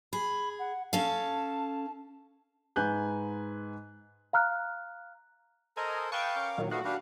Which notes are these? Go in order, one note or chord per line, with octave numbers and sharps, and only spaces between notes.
G#4 B5
F#5
C#4 A4 F5 A5
G#2 B4 G#5 F#6 G6
F5 A#5 F6 F#6
A4 A#4 C5 D#5 G#5 A#5
B4 F5 G5 A5 C#6 D#6
C#4 A#4 D6
A#2 D#3 F#3
A#2 A3 B3 F#4 D#5 F5
D4 G4 B4 F5